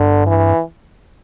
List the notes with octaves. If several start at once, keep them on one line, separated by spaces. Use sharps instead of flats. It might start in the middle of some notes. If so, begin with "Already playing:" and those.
Already playing: G2 D3
E3